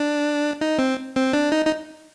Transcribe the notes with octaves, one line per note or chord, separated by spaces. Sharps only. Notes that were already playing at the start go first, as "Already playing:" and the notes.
Already playing: D4
D#4
C4
C4
D4
D#4
D#4